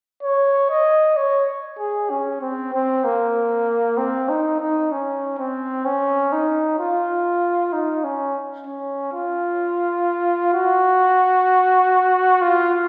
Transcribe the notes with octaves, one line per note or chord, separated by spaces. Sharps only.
C#5
D#5
C#5
G#4
C#4
C4
C4
A#3
C4
D#4
D#4
C#4
C4
C#4
D#4
F4
D#4
C#4
C#4
F4
F#4
F4